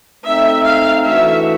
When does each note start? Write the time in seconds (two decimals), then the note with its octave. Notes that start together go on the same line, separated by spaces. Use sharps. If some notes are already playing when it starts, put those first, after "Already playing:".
0.24 A3 C4 D#4 E5
0.66 F5
1.06 E3 A3 D4 F#4 E5